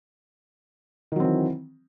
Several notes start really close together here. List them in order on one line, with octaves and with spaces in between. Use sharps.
D#3 F#3 C4 E3